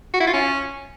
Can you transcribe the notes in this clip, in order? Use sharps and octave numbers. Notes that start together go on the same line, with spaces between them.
F#4
E4
F4
C#4